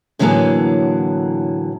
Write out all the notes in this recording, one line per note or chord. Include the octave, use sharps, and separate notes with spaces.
A2 D3 E3 F#3 A#3 G#4